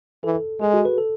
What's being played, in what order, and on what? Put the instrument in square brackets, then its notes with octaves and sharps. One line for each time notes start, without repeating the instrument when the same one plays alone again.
[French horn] E3 [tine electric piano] A4
[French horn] G#3 [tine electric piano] G#4
[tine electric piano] F#4
B4
A4